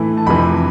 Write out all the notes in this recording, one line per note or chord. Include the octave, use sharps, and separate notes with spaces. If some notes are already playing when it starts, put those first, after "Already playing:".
Already playing: A2 E3 A3 E4
A5
F2 C3 E3 B5